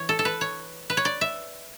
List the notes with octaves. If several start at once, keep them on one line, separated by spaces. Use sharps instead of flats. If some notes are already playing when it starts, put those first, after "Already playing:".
Already playing: E3 C#5
A4
A4
B4
C#5
B4
C#5
D5
E5